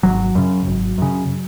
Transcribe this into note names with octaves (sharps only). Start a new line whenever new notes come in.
G#1 F#3
F#2 C#3
G#1
F#2 C#3